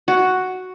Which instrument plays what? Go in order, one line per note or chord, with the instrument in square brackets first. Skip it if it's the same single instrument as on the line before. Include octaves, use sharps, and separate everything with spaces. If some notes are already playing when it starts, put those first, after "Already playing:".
[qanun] F#4